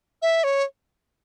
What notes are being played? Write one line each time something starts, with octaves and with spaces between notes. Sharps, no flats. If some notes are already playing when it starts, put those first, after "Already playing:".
E5
C#5